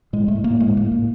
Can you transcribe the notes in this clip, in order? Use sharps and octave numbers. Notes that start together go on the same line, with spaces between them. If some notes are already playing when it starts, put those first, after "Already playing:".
A2 G#3
A2 A3
A2 A#3
A2 G#3
A2 A#3
A2